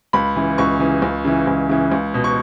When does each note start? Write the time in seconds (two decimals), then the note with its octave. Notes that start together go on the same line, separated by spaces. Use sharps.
0.13 C#2 B5
0.36 C#3 E3
0.58 C#2 C#6
0.80 C#3 E3
1.02 C#2
1.25 C#3 E3
1.47 C#2
1.69 C#3 E3
1.92 C#2
2.14 B2
2.24 C#6